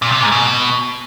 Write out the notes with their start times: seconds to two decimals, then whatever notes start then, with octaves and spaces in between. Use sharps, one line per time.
0.02 A#2
0.12 C3
0.22 G#2
0.32 B2